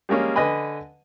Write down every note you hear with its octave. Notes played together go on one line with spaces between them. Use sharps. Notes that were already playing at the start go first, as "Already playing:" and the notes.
G3 G#3 A#3 C#4
D3 B4 D#5 G#5 B5